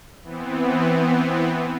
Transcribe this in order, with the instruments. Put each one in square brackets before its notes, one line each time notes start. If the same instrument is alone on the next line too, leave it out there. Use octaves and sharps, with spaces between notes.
[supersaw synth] E3 B3 C4